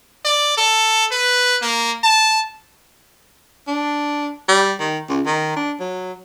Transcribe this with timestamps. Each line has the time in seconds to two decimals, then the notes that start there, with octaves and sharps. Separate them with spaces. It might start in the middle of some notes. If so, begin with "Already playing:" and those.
0.25 D5
0.57 A4
1.11 B4
1.62 A#3
2.03 A5
3.68 D4
4.49 G3
4.80 D#3
5.09 C#2
5.26 D#3
5.56 D4
5.80 F#3